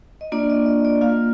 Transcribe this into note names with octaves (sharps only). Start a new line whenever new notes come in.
D#5
A#3 D4 F4 D5
D#5
D#5
D5
A#3 F4 F5